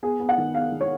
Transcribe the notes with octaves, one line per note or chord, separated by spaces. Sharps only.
B3 G#4
B3
F#5
D#3
B3 F5
D#3
C#5